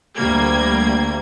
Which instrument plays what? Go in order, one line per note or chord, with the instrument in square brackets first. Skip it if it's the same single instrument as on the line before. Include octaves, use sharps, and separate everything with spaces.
[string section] D2 G3 A#3 G#6